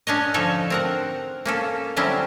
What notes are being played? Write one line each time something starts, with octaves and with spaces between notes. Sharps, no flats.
C#4 D4 C#5 D#5
D3 F3 D#4 A4 C#5
C4 A#4 F#5
A#3 C#4 A4
D3 F#3 G3 C4 C#4 E4